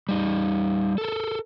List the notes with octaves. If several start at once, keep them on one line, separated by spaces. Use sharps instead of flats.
G3 D#4
A4 A#4